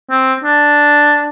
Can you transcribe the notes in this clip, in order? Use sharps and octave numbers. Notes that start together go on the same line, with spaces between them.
C4
D4